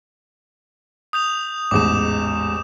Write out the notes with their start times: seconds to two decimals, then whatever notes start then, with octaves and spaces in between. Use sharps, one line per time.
1.13 D#6 G6 F7
1.71 A1 E2 G#2 D6 E7